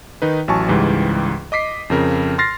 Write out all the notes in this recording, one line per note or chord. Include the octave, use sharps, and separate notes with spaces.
D#3 D#4 B4
A1 F#3 G#5 A5 C#6
C#2 G#2 E3 G3
D#5 D6 B6 C7
F2 C#3 A#4
C6 F6 A6 A#6 C7